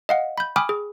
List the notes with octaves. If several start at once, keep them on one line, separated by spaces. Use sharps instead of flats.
D#5 F5 F#5
B5 G6
G5 G#5 B5 D6 D#6 F6
G#4